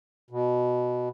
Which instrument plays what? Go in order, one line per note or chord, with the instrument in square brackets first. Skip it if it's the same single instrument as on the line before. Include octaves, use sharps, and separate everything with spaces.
[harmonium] B2